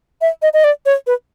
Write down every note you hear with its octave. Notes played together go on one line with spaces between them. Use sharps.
E5
D#5
D#5
D5
C#5
B4